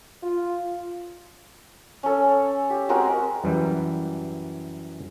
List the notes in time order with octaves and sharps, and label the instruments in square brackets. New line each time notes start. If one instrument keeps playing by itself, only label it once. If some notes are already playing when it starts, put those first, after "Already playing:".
[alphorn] F4
[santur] C#4 A4
G4
G#3 C4 F#4 A#4
[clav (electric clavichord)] F#2 E3 G3